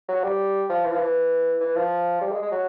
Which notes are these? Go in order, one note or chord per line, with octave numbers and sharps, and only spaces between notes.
F#3
G3
F3
E3
F3
E3
E3
F3
G3
G#3
G#3
F#3